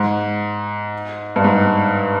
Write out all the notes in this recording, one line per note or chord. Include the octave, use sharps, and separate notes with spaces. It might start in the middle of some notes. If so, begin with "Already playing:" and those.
Already playing: G#2
G2
G#2